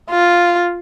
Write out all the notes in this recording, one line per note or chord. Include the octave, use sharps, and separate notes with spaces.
F4